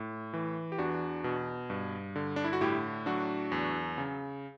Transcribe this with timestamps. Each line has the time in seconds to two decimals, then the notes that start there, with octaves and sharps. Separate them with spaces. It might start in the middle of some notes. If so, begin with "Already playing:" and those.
Already playing: A2
0.34 E3
0.72 G4
0.78 E2 D4 F#4
1.24 B2
1.70 G2
2.16 D3
2.36 D4
2.44 E4
2.53 F#4
2.61 A2 E4 G4
3.06 F#3 D4 F#4
3.52 E2
3.98 C#3